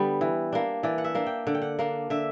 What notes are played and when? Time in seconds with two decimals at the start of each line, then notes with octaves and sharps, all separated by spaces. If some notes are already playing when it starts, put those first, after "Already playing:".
Already playing: D3 G3 B3
0.21 E3
0.53 A#3 D4
0.83 E3 D5
0.98 F#5
1.04 E5
1.15 A#3 D4
1.26 G5
1.47 D3 F#5
1.55 G5
1.62 F#5
1.79 A#3 D4
2.10 D3 E5